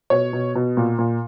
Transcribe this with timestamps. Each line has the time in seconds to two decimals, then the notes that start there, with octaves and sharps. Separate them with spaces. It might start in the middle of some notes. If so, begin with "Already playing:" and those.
0.10 B2 C#5
0.33 B2
0.55 B2
0.77 A#2
0.99 A#2